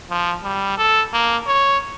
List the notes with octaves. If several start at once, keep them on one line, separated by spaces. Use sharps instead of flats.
F3
G3
A4
A#3
C#5